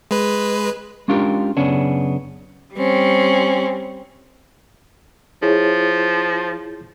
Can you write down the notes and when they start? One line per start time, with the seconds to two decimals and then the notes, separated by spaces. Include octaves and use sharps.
0.11 G#3 B4
1.08 G#3 C#4 D4 F4 G4 A#4
1.57 F#2 C#3 B3 C#4 D4
2.74 G3 C4 C#4
5.42 F3 E4 G#4 C#5